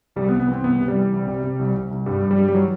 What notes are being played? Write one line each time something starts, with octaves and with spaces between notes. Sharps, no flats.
C2 G3
B3
C2
B3
E3 C4
C2 B3
C3
G3
E3
C2
C3
C3
C2
C2
C2
G2 G3
G2
G3
G2
G3
E3 F#3